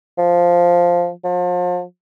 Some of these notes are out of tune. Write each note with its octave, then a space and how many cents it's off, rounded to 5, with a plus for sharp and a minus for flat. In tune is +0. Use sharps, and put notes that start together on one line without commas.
F3 +0
F3 +40